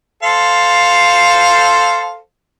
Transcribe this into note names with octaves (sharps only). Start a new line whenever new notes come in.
A4 C5 F5